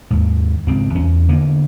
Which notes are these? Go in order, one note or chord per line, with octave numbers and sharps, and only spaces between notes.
D#2 G#2
G#1 C#2 C4
E2 C#4
D3 A#3 B3